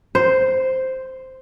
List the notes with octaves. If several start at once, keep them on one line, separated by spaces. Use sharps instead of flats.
C5